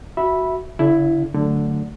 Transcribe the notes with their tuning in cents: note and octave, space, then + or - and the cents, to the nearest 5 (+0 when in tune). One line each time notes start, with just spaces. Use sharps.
F#4 +0 E5 +0 B5 -10
D3 -40 E4 +10
D3 +0 F#3 +0 A3 +0